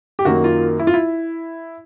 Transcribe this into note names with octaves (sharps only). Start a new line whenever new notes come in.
G4
F#2 D#3 F#3 A#3 F#4
F4
E4
F4
E4